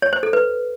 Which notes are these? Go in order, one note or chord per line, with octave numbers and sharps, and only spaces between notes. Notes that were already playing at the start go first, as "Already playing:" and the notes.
C#5
C5
A4
B4